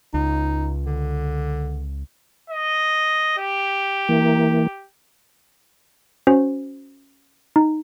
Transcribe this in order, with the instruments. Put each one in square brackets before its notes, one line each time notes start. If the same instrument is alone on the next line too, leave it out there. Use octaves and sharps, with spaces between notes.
[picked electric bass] C#2 [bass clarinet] D#4
[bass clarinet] D3
[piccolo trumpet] D#5
G4
[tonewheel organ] E3 A#3
[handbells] C#4 F#4 C5
D#4